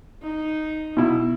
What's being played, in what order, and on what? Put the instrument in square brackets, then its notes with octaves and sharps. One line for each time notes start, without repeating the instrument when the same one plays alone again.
[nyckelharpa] D#4
[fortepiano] B2 E4